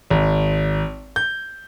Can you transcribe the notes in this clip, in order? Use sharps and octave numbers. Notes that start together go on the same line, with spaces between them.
G#1
G6